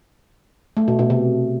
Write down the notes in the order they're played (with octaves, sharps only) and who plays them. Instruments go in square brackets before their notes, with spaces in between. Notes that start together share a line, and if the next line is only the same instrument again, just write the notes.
[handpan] A3
B2
B2
C3